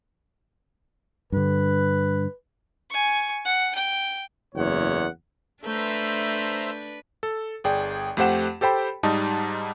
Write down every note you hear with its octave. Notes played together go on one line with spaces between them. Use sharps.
G2 D3 B4
G#5 C#6
F#5
G5
F#1 E2 C#5 F#5
A3 D4 B4 C5 E5 A#5 G6
A4
G1 G#4 D5 G5
F2 A3 G4 C5 F#5 E7
G4 A4 C5 G5 B5
G#2 G3 D#4 A5 D#6